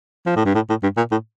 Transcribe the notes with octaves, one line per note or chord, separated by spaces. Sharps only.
F3
A2
G2
A2
A2
G2
A#2
A2